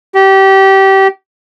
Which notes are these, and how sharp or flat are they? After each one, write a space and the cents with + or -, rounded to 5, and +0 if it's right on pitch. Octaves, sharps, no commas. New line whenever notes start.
G4 -25